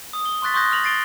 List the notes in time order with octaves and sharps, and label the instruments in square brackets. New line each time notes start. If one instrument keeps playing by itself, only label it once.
[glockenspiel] D#6
G7
C6 C#6 F#6 A6 B6
C6 C#6 D#6 F#6 G6 A#6
C#6 F6 A#6 F7 F#7
A6 C7 D7 G7